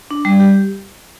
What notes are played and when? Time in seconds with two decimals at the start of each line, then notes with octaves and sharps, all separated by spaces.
0.11 D4
0.25 G3
0.40 G4